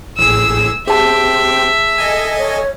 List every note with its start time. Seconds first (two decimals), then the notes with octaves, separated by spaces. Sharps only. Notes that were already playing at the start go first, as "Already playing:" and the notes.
0.17 A1 A2 G#4 E6
0.87 C4 G4 G#4 E5 A5
1.98 A4 D#5 G#5
2.38 C#5